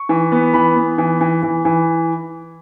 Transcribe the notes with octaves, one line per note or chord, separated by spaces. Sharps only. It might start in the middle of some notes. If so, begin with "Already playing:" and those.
Already playing: C#6
E3
B3
E3 B5
B3
E3
E3
E3
E3